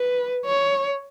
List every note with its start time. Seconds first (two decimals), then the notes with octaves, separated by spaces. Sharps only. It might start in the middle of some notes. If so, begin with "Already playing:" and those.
Already playing: B4
0.45 C#5